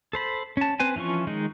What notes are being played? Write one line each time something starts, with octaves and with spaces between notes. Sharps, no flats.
A4 C5 B5
C#4 A5
C4 B4 C5 G#5
E3 F3 C#4 F4 C#6
D#3 G#3 D#4